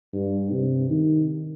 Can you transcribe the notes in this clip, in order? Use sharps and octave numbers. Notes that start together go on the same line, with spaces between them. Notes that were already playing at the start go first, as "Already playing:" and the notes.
G2
C3
D#3